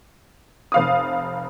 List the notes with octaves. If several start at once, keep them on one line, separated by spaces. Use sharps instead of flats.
F1 F5 D#6